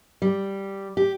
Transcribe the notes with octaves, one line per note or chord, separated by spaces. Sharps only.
G3
G4